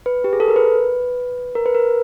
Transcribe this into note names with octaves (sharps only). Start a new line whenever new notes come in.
B4
G4
G#4
A4
A#4
B4
A#4
B4
A#4